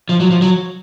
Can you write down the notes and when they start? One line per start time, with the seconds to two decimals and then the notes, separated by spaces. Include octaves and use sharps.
0.09 F3
0.20 F#3
0.31 F3
0.42 F#3